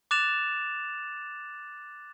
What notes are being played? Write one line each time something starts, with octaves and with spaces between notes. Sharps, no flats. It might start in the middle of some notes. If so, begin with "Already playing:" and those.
D6 F#6 A6 E7 F7